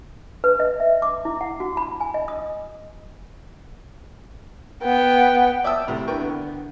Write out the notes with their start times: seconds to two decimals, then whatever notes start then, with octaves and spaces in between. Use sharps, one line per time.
0.44 B4
0.60 D#5
0.80 E5
1.02 D6
1.25 E4
1.41 F#5
1.60 F#4
1.77 B5
2.01 G#5
2.14 D#5
2.28 D#6
4.83 B3 G5
5.64 D5 E5 G5 A5 D#6 E6
5.87 E2 C3 A3
6.07 D4 E4 A#4 B4 G5 C#6
6.20 D3 B3